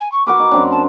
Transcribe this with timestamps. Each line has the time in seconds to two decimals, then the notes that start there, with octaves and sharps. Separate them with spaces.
0.01 G#5
0.12 C#6
0.27 F#4 A#4 B4 D6
0.40 D#3
0.52 F#2 C4 D4
0.71 A5